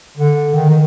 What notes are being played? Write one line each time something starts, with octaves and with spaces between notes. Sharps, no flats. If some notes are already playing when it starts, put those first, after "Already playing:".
D3
D#3
D#3